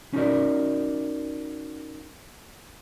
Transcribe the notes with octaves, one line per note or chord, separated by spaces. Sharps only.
C#4 D#4 F#4 A#4 D5